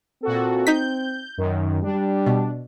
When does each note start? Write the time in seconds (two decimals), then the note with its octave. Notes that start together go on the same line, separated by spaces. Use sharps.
0.23 A#2 C4 F#4 A4
0.67 D#4 G6 B6
1.38 F#2 D#3
1.83 G3 D4
2.27 B2